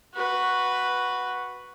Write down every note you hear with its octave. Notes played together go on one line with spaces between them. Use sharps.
F#4 B4